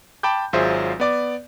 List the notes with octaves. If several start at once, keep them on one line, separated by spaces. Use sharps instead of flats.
G5 A5 B5 D6 G6
G#1 F#3 F4 G#4 C5 E5
B3 D5 D6